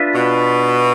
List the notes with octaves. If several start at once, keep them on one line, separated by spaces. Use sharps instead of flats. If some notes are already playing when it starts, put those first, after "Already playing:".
Already playing: D4 F4 B4 E5
B2